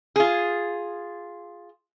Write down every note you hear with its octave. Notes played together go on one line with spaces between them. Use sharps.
F4 G#4